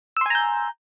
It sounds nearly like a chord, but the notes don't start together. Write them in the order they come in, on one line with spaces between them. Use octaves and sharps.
E6 C6 G#5 A#5 G6